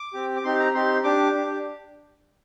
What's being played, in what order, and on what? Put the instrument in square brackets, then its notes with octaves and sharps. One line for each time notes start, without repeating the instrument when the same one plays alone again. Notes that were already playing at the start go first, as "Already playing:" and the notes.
Already playing: [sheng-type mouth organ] D6
C4 G4
D6
C4 D#4 G4 C6
A#5
C4 D#4 G4 C6
D4 G4 D6
D4 G4